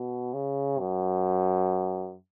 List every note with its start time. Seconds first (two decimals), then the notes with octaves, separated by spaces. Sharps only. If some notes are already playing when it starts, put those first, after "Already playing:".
Already playing: B2
0.34 C#3
0.79 F#2